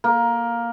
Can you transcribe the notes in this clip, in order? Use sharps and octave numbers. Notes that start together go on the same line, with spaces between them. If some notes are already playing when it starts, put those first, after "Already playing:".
A#3